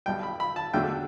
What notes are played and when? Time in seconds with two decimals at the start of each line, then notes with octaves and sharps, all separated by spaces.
0.06 B1 B2 G3 G5
0.23 B5
0.40 B5
0.56 A5
0.74 E2 D3 F#3 A3 G5